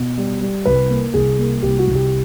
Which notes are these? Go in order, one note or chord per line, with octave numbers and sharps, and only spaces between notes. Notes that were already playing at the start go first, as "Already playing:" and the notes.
Already playing: B2
G3
G3
C2 B4
A#3
C2 G#4
A#3
C2 G4
F#4
C2
G4